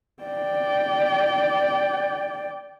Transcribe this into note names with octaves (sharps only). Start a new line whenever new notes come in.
D5 G5